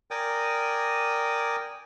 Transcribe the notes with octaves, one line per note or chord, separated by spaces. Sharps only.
A#4 D5 G5 G#5 D6 D#6